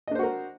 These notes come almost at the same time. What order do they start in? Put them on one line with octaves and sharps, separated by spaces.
D#5 D4 C5 F#4 A#4